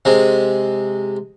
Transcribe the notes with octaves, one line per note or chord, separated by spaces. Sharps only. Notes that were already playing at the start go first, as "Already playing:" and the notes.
C3 G#3